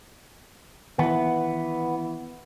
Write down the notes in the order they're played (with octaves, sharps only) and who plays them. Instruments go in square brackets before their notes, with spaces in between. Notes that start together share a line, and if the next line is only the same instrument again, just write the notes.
[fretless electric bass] D#3 [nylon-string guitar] E3 B4 [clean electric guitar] B3